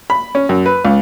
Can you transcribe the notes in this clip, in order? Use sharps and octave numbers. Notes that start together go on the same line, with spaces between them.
B5
C#4
F#2
B4
C#2